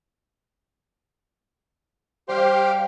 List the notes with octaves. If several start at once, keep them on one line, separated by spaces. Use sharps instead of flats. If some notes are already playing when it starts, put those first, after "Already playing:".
G3 G4 C5 F5 G5